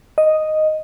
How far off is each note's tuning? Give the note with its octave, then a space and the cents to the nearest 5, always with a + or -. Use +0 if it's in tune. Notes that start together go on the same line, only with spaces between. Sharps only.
D#5 +0